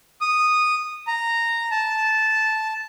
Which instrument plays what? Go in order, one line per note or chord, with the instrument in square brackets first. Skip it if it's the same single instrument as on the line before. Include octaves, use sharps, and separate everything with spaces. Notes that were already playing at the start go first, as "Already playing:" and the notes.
[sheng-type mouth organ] D#6
A#5
A5